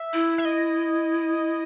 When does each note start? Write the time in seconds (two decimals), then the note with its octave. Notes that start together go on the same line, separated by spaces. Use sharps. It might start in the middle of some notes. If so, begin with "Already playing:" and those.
Already playing: E5
0.14 E4
0.38 E5
0.45 D#5